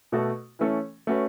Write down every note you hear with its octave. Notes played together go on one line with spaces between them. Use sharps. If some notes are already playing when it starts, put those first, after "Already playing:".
B2 A3 F#4 A4
E3 A3 C#4 A4
A3 C#4 F#4 B4